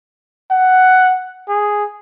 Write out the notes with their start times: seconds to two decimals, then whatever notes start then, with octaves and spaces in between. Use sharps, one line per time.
0.51 F#5
1.48 G#4